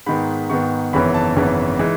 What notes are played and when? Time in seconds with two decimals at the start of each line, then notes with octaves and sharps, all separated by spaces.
0.06 G#2 D#3 G#3 B3 B5
0.49 G#2 D#3 G#3 B3 C#6
0.93 G#1 F#2 C#3 E3 B3 B5
1.14 A5
1.36 G#1 F#2 C#3 E3 B3
1.79 E3 G#3 D#4